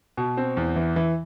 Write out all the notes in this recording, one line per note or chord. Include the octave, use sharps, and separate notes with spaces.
B2
C4
E2
E3
E3